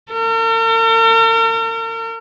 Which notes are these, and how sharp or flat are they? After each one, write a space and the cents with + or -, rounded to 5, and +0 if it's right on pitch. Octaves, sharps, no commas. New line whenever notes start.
A#4 -45